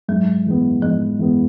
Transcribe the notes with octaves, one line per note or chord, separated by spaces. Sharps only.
G#2 F#3
E3 G#3 B3
G#2 F3
E3 G#3 B3